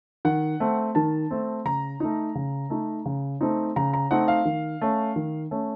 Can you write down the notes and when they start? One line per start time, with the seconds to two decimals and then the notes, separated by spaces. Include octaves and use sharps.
0.25 D#3 F#5
0.60 A3 C4
0.95 D#3 A5
1.31 A3 C4
1.65 C#3 A#5
2.00 A3 D#4
2.35 C#3
2.70 A3 D#4
3.06 C#3
3.41 A3 C4 D#4
3.76 C#3 A#5
3.94 A#5
4.11 A3 C4 D#4 F#5
4.28 F5
4.45 D#3
4.81 A3 C#4
5.16 D#3
5.51 A3 C#4